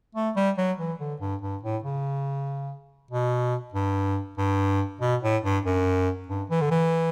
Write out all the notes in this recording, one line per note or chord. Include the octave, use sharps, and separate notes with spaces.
A3
G3
F#3
E3
D3
G2
G2
A2
C#3
B2
G2
G2
B2
A2
G2
F#2
G2
E3
D3
E3